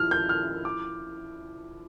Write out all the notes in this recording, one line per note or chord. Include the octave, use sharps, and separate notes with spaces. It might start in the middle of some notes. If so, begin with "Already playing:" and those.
Already playing: F3 E4 F6
G6
F6
D6